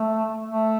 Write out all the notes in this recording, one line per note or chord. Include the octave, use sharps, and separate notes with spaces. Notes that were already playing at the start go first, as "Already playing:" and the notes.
Already playing: A3
A3